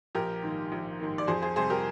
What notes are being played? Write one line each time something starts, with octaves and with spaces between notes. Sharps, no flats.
A#1 G4 A#4
G#2 D#3 A#3
A#1
G#2 D#3 A#3
D5
F2 G#4 C5
G#4 C5
C3 G3 C4 G#4 C5
G4 A#4